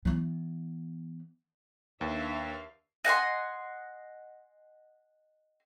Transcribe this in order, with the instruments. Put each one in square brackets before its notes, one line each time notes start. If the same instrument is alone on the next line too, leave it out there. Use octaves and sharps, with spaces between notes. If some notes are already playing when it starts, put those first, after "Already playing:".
[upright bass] E3 B3
[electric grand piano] D#2 [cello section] D4 E5 F5 [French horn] B4
[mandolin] D#5 F#5 G#5 C6